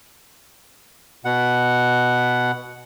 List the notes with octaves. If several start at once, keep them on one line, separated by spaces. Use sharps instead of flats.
B2 F#5